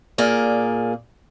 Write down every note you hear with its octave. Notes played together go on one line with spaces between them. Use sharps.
A#2 A#3 G#4 D5